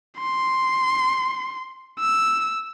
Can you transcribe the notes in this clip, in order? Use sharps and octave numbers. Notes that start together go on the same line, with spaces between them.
C6
E6